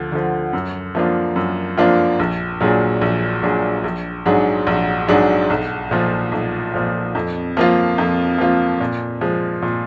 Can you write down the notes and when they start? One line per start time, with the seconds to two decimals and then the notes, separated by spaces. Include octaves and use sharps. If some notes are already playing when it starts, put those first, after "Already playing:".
Already playing: D2 F3
0.12 D3 F3
0.53 F#2
0.95 F3 A#3 D4 F4
1.36 F#2
1.77 F3 A#3 D4 F4
2.19 A#1
2.60 A#2 F#3 D4 G#4
3.01 A#1
3.43 A#2 F#3 D4 G#4
3.84 A#1
4.26 G#2 F#3 D4 G#4
4.67 A#1
5.08 G#2 F#3 D4 G#4
5.50 B1
5.91 A#2 F3
6.32 B1
6.74 A#2 F3
7.15 F2
7.57 F3 A#3 F4
7.98 F2
8.38 F3 A#3 F4
8.80 A#2
9.21 F3 G#3
9.62 A#2